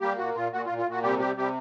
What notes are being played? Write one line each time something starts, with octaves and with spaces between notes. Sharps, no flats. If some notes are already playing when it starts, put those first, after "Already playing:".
G3 A#3 G4
A#2 F#4
A#2 F4
A#2 F#4
F4
A#2
F4
A#2 F#4
C3 G3 G4
G3 G4
C3 G3 G4